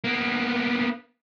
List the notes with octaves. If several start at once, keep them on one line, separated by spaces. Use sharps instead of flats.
A#3 B3